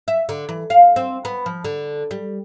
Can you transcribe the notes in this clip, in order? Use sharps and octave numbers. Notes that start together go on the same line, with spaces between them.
E5
D3
E3
F5
C4
B3
F3
D3
G3